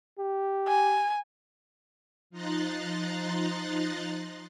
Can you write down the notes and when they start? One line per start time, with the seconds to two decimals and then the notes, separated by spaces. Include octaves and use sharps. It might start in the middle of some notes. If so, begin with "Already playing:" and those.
0.18 G4
0.68 G#5
2.30 F3 D#4 A#5 C6 F#6 A6